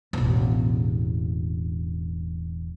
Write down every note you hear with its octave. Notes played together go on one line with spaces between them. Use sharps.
E1 A1